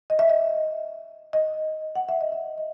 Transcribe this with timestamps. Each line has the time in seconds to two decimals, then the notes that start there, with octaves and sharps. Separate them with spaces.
0.10 D#5
0.19 E5
0.30 D#5
1.33 D#5
1.96 F#5
2.09 E5
2.21 D#5
2.32 E5
2.58 D#5